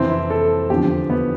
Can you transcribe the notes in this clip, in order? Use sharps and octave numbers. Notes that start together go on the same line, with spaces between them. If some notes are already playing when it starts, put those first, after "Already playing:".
Already playing: F2 C3 E3 C4
E4
A4
E2 D3 F3 G4
B3